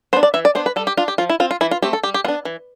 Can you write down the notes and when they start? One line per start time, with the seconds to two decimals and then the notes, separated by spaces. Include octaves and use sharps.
0.13 B3 D4 C5
0.23 D5
0.34 E3 E5
0.45 D5
0.55 B3 D4 C5
0.66 B4
0.76 G3 A4
0.87 G4
0.97 D4 F4
1.08 G4
1.18 F3 F4
1.30 E4
1.40 C4 F4
1.51 F4
1.61 E3 E4
1.71 F4
1.82 A3 C4 G4
1.93 A4
2.03 G3 G4
2.14 G4
2.24 B3 F4
2.28 D4
2.45 E3